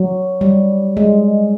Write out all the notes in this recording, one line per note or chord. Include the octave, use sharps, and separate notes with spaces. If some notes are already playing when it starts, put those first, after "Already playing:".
Already playing: F#3
G3
G#3